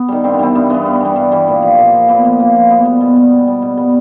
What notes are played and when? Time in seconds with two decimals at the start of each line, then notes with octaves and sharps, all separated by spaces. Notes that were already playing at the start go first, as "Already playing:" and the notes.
Already playing: B3
0.08 D#3 G3
0.24 G2 C4
0.33 B3
0.39 E3 G3 C4
0.55 G2 B3
0.70 E3 G3 B3
0.85 G2 B3
1.01 E3 G3
1.16 G2
1.32 E3 G3
1.48 A#2
1.62 F3
1.78 A#2
1.94 F3
2.08 A#2 B3
2.25 F3
2.40 A#2
2.56 F3
2.70 B2 B3
2.85 G3 B3
3.01 B2 B3
3.16 G3
3.32 B2
3.47 G3
3.62 B2
3.77 G3 B3